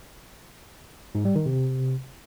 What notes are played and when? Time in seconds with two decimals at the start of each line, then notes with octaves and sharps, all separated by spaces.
1.15 G#2
1.25 G3
1.35 D#3
1.46 C3